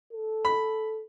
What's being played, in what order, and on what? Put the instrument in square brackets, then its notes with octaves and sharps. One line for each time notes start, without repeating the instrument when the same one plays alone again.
[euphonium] A4
[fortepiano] B5